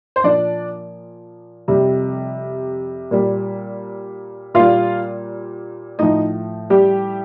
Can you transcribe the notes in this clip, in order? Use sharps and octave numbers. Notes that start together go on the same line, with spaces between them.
C5
A#2 F3 D4 D5
F2 C3 G3
A#2 G3
A#2 G3 F4 F5
A2 F3 D#4 D#5
G3 G4